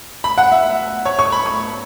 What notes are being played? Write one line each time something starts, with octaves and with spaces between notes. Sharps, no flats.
B5
F#5
E5
C#5
C#6
B5
C#6